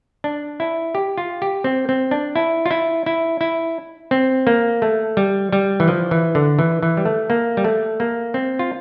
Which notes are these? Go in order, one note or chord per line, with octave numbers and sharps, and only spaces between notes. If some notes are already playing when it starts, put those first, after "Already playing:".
D4
E4
G4
F4
G4
C4
C4
D4
E4
F4
E4
E4
E4
C4
A#3
A3
G3
G3
E3
F3
E3
D3
E3
E3
G3
A3
A#3
G3
A3
A#3
C4
F4